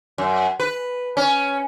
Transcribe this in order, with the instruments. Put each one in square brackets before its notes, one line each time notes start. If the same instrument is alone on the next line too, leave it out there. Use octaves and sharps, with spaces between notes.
[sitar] F#2
B4
C#4